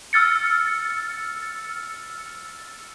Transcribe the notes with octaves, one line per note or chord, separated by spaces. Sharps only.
E6 F6 A6 C#7